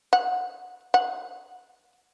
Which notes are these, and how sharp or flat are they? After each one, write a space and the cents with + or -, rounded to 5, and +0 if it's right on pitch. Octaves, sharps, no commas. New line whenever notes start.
F#5 -20
F#5 -10